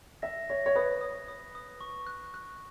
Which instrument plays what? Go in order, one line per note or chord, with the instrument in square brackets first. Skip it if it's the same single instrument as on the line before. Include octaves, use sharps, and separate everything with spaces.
[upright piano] E5 [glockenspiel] A#6
[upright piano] C#5 [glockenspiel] A#6
[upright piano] C#5
[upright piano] B4 [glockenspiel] D#6
[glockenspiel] D#6
D#6
D#6
C#6
F#6
F#6